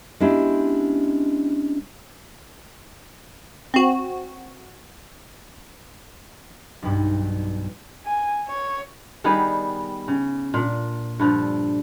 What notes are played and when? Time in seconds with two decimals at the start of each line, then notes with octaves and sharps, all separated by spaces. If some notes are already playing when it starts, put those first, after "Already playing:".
0.20 G#3 B3 C#4 D4 E4 G4
3.74 C4 F#4
6.82 B1 G2
8.06 G#5
8.48 C#5
9.24 D#3 G3 B3 G#4
10.08 C#3
10.54 A#2 D4
11.19 G2 D3 F3